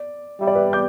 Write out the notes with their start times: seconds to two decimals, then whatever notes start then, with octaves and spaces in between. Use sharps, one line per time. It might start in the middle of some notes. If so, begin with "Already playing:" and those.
Already playing: D5
0.40 G3 E5
0.47 D5
0.55 B4 E5
0.73 D6 G6